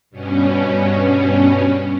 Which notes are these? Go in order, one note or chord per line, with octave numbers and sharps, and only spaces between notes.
G2 B2 C#4